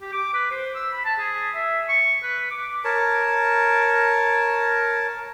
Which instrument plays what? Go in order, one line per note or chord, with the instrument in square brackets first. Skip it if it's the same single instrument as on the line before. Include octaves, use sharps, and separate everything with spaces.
[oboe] G4
D6
B4
C5
E6
B5
A5
G#4
E5
C#6
B4
D6
[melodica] A#4 C#5 A5